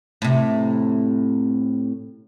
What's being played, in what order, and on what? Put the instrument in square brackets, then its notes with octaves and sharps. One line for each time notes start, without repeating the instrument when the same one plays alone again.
[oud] A2 C3